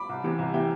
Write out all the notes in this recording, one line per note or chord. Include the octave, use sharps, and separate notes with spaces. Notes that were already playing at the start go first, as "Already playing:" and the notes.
Already playing: B5 D6
C2
C3 E3
C2
C3 E3 E5 G5